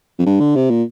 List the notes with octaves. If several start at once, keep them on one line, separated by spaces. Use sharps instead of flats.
F2
G2
D3
C3
A#2